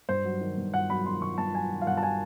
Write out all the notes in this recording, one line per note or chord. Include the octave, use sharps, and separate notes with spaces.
G2 C5
F#3
D#3
G2
G2 F#5
F#3 B5
D#3 C6
G2 C#6
G2 A5
F#3 G#5
D#3
F5
G2 F#5
A5
G#5